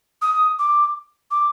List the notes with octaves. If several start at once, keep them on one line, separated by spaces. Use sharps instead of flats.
D#6
D6
D6